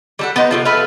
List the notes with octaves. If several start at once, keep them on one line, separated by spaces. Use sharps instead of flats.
G3 A4 F#5
B3 D#4 C5
A2 C3 F3
A4 B4 E5 F5